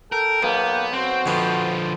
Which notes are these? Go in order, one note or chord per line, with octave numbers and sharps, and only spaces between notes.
A4 A#4 G5
B1 A#3 B3
C4 F#4 C5
F2 D3 F3 B3